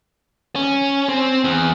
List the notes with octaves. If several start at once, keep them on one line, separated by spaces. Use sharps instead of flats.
C#4
C4
E2